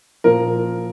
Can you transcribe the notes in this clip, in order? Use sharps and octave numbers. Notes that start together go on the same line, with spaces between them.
A#2 F3 A#3 A#4